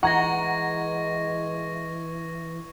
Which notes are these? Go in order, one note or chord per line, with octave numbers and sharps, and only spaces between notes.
E3 G#3 F#5 A#5 C#6 G#6 A#6